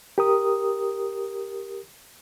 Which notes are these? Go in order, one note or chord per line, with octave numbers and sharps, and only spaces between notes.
G4 A#4 D#6